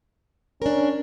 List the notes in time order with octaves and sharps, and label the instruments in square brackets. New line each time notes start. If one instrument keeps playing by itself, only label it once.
[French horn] C#4 [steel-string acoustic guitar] D4 A#4